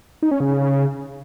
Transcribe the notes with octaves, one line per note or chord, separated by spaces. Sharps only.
D#4
C#4
C#3